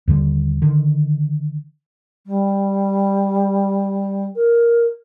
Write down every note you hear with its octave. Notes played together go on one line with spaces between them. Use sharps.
D#2 D3 G3
D3 D#3
G3
A#4